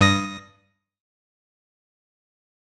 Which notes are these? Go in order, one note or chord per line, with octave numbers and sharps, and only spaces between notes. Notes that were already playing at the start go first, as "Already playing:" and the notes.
G2 D#6 A#6